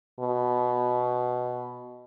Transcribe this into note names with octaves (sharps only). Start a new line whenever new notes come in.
B2